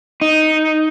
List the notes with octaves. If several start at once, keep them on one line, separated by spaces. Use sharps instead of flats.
D#4